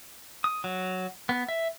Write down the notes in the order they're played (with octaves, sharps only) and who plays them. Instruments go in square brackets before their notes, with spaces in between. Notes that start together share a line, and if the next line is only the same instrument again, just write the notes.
[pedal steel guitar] D#6
F#3
B3
E5